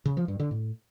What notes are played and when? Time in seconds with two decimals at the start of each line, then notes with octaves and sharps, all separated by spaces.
0.05 C#3
0.17 F3
0.28 G2
0.40 D3
0.51 A2